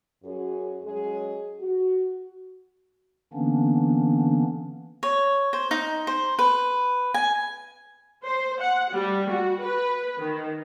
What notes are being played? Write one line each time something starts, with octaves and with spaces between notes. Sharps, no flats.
F#2 F#4 G#4
F#3 G#3 C#4 G#4
F#4
D3 E3 A#3 B3 C#4 D4
C#5
C5
D#4
C5
B4
G#5
C5
F#5
G3
F#4
B4
D#3